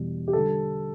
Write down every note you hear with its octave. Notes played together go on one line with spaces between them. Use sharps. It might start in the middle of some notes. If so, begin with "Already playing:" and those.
Already playing: E2 B2 G3
G4
D3 G3 A4